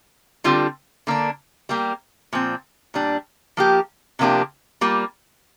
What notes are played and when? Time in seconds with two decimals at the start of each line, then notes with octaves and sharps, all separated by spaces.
0.44 D3 G3 C4 F4
1.07 D3 A#3 D4
1.69 G3 A#3 G4
2.33 A#2 F3 C4
2.94 A#2 G3 D4
3.57 F3 A#3 G4
4.19 C3 F3 A#3 D4 G4
4.81 G3 A#3 F4